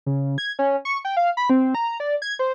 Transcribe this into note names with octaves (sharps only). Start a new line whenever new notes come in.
C#3
G#6
C#4
C#6
G5
F5
B5
C4
A#5
D5
G#6
C5